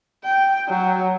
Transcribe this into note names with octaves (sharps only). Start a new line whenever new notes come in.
G5
F#3